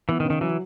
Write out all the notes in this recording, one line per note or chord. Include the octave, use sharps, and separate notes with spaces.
E3 B3
D#3
C#3
D#3
E3 F#3